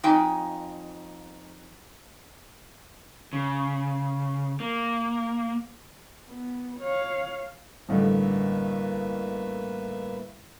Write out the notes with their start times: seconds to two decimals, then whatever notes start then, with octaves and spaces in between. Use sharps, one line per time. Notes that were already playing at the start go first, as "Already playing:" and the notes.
0.04 F2 D#4 G5 G#5
3.33 C#3
4.60 A#3
6.28 B3
6.80 C#5 F5
7.89 A1 G2 D3 A#3 B4 E5